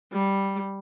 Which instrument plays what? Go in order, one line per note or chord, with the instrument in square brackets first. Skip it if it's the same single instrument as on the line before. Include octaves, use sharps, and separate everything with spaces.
[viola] G3